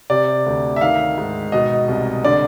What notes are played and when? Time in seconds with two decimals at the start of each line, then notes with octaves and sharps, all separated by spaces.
0.10 C3 D5
0.46 D2
0.76 E5
0.81 D#3 F5
1.18 G#2
1.52 B2 D#5
1.88 C2
2.24 D3 D5